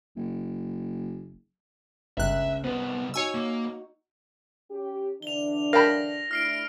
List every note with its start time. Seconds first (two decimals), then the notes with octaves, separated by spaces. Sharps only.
0.17 F#1
2.17 G1 C#2 C#4 E5 F#6
2.64 C2 B3 B4 C5
3.14 D#4 F#4 C#5 G#5 C#6 E6
3.35 A#3
4.70 C#4 G4
5.22 D3 E3 D4 F7 G7
5.73 A#4 F5 G5 A5 B5 A#6
6.31 A3 D4 E4 F6 C7 D7